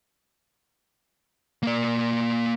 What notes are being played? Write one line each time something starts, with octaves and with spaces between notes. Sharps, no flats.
A#3 D5